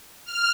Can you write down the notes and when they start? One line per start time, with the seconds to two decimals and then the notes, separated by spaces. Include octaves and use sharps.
0.25 F6